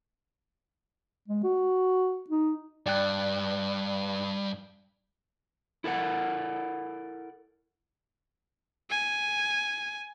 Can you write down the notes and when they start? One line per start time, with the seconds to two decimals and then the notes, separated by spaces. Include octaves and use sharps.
1.28 G#3
1.44 F#4
2.30 D#4
2.86 G2 D5 G5 F#6
5.84 E4 A4 A#4 F#5
8.90 G#5